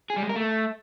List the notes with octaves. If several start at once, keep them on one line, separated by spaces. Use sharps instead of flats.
G#4
G3
G#3
A#4
A3